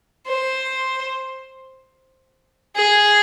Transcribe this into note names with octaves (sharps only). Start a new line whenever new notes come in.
C5
G#4